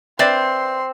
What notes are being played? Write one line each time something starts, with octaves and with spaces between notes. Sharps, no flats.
C4 B4 D5 E5 C6